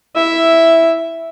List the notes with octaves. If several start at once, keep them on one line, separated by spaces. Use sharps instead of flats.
E4 E5